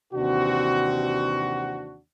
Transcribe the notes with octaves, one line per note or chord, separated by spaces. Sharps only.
D#2 C3 E3 C4 D4 F#4